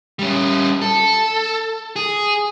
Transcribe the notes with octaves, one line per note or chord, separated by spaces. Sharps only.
G3 C#4
A4
G#4